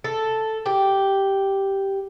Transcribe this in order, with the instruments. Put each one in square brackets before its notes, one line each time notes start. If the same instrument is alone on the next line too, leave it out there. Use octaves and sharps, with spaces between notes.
[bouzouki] A4
G4